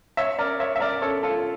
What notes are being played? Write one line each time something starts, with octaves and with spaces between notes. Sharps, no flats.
C#5 E5
A#4 D5
C#5 E5
E5
A#4 D5
A4 C#5
F4 A4